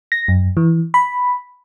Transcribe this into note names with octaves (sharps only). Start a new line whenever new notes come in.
A#6
F#2
E3
B5